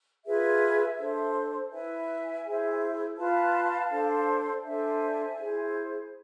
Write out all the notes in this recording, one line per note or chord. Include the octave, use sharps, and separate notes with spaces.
F4 G#4 B4 E5
D4 A4 C5
E4 B4 E5 G#5
E4 G#4 C5
F4 B4 F5 A5
D4 A4 C5
D4 A4 C5 E5 G#5
E4 G#4 C5